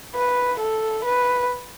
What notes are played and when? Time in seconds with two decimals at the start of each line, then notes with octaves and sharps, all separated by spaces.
0.15 B4
0.60 A4
1.05 B4